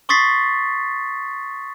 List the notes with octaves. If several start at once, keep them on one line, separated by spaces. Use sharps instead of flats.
C6 C#6 D#6 A6 B6 C7